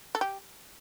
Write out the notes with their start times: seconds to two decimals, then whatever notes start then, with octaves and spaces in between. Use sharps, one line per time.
0.15 A4
0.21 G4